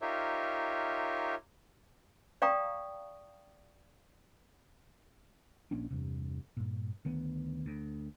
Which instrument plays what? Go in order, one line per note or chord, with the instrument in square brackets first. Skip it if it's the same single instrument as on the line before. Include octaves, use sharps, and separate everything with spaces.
[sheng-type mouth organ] D#4 F4 G4 A#4 C#5 E5
[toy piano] D5 F5 G5 A#5 C#6 D#6
[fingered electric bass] A#1 A#3 C#4 D4
E2 G2 C3
G2 A#2
D2 D#3 B3
D2